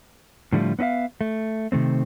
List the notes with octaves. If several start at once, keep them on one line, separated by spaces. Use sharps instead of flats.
A2 D3 F3 G3 A3
B3 C#4 F4 E5 F5
A3
C3 D#3 A3 C4